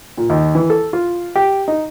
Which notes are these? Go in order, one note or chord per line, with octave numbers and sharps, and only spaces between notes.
A#2
D#2
E3
A4
F4
G4
D#4